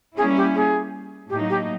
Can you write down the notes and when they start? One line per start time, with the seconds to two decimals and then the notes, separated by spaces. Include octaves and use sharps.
0.17 G3 A#3 C#4 E4 G#4
0.37 G4
0.55 G#4
1.30 A2 F#3 A#3 D#4 G4
1.50 G4